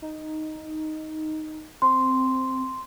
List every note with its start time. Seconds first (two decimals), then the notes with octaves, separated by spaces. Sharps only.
0.02 D#4
1.82 C4 C6